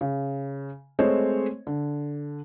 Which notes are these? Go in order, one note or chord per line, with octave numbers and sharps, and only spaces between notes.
C#3
G#3 A3 C4 C5 C#5 D#5
D3